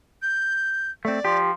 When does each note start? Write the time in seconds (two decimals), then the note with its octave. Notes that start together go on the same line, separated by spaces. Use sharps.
0.22 G6
1.05 A3 C4 D5
1.25 F3 G4